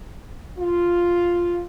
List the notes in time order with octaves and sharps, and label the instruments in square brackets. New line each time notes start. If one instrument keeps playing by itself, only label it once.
[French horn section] F4